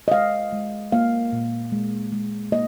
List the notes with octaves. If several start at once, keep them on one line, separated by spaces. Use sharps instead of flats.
D#5
G#3 F5
G#3
A#3 F5
A#2
G#3
G#3
A#3 D#5